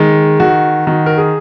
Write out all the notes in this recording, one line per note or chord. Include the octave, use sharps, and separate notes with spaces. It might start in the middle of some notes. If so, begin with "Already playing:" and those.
Already playing: D#3 G#3
D#3 F#4
D#3 F#4
A#4
G#4